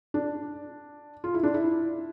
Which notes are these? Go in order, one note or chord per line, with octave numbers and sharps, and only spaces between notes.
D4
F4
E4
D4
E4